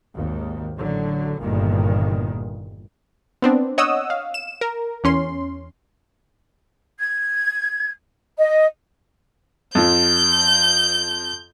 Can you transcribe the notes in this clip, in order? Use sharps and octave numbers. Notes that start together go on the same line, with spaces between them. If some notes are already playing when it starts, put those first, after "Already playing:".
G#1 D#2
A1 D3 F#3
G1 E2 G2 A#2 D#3
B3 C4 D4
C#5 D#5 F#5 D#6 E6
F5
E7
A#4
E2 C#4 C6
G#6
D#5
F2 F3 G6